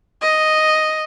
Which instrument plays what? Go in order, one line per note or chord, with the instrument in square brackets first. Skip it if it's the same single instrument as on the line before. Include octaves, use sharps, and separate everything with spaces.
[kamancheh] D#5